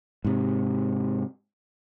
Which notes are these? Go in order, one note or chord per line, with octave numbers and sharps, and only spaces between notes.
G#2 C3